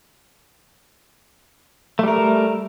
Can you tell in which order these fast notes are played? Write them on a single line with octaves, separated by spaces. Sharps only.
A3 G3 A#4